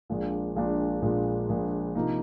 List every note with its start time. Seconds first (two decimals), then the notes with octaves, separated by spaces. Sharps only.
0.10 A#1 A#2 G#3 D4
0.56 A#1 A#2 G#3 D4
1.02 A#1 A#2 G#3 D4
1.49 A#1 A#2 G#3 D4
1.95 C3 F3 A#3 D#4